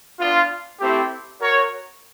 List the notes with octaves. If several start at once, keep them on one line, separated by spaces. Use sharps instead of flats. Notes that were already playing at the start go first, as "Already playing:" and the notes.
B3 D4 F4
A3 C4 E4 G4
F#4 A#4 C#5